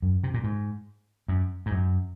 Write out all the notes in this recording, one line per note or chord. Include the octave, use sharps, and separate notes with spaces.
F#2
C3
A#2
G#2
F#2
G#2
F#2